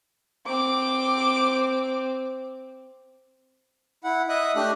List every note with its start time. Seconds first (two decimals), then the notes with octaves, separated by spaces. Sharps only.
0.46 C4 D6
4.04 E4 F#5
4.29 D#5 E5 D#6 F#6
4.56 A3 D4 G4 F#6